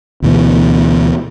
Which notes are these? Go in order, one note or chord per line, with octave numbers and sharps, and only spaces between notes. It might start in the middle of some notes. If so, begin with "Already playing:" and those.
D2 B2 E3